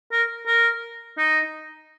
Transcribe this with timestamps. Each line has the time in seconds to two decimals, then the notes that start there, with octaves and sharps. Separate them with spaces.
0.12 A#4
0.47 A#4
1.18 D#4